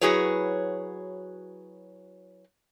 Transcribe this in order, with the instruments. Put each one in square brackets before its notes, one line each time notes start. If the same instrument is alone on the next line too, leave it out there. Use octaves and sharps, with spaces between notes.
[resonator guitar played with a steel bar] F#3 E4 F#4 G#4 B4 C#5